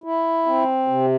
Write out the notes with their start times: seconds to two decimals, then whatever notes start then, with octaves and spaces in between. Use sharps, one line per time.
0.04 E4
0.46 C4
0.87 C3